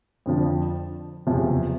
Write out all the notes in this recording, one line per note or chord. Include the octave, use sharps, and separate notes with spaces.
F2 D3 F3
F#1 E2 C3 F3